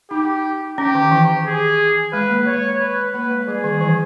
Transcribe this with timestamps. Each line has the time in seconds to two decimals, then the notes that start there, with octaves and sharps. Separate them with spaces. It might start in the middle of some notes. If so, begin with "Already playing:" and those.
0.11 D#4 G4
0.78 C#4 G4
0.95 D#3
1.12 E3
1.46 G#4
2.13 G#3 B4
2.29 A#3
2.46 C#5
2.80 B4
3.14 A#3 B4
3.31 G#3
3.48 G3 G#4
3.64 D#3
3.81 E3